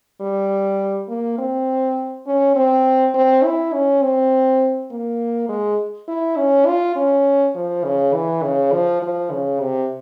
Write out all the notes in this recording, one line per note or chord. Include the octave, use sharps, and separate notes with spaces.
G3
A#3
C4
C#4
C4
C4
E4
C#4
C4
A#3
G#3
E4
C#4
F4
C#4
F3
C#3
E3
C#3
F3
F3
C#3
C3